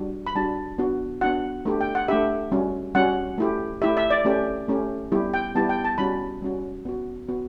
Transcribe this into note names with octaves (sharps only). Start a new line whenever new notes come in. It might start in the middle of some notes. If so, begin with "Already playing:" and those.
Already playing: G3 D4 F#4
B5
G3 D4 F#4 A5
B3 D4 F#4
B3 D4 F#4 F#5
A3 D4 G4
G5
F#5
A3 D4 G4 E5
G3 C#4 F#4
G3 C#4 F#4 F#5
A3 E4 G4
A3 E4 G4 E5
E5
D5
A3 C#4 G4
A3 C#4 G4
G3 B3 E4 G4
G5
G3 B3 E4 G4 A5
G5
A5
G3 C#4 F#4 B5
G3 C#4 F#4
B3 F#4
B3 F#4